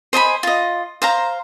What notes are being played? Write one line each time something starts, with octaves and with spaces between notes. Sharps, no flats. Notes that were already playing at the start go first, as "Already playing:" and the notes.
C5 D#5 G#5 B5
F4 D#5
C5 F5 A#5